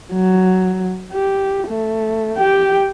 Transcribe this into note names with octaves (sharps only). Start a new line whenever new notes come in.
F#3
G4
A3
G4 G5